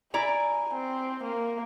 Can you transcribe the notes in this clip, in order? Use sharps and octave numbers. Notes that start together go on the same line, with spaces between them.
E4 D5 G#5 A#5
C4
A#3